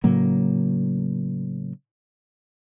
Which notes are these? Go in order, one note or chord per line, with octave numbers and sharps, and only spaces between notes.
A2 C#3 F#3 A#3